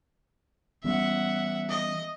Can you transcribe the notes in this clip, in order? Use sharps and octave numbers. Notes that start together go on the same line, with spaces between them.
E3 G3 B3 E5 F#5
D#5